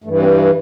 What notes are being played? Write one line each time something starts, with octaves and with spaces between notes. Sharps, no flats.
G2 E3 A3
C4
E4